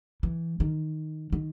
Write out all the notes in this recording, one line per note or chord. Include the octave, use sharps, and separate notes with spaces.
E3
D#3
D#3